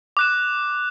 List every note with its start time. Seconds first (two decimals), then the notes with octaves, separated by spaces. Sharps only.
0.17 D6 F#6 E7